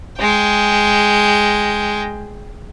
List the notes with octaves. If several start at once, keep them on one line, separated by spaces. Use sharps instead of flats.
G#3 G5